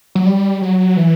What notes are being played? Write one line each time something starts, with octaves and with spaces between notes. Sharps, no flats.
F#3
G3
F#3
E3